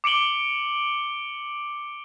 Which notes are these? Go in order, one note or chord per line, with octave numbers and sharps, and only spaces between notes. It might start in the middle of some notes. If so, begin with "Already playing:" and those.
D6 C#7 D7 F#7 G7